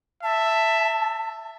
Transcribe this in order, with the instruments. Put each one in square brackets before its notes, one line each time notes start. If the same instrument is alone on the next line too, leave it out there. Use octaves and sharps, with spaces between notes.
[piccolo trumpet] E5 [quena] A5